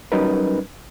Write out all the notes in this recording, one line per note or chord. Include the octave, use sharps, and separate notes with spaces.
F#3 G3 C#4 D#4 A#4 B4